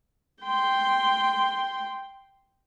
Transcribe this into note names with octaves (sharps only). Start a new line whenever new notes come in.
G5 C6